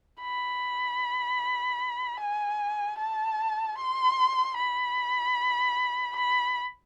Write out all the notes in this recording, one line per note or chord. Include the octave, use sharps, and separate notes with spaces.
B5
G#5
A5
C6
B5
B5